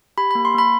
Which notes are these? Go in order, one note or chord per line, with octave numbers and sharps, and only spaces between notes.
G4 B5
A#3 B5
C6
A#3 B5